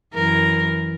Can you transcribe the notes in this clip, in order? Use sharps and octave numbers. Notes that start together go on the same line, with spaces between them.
F#2 E3 A#4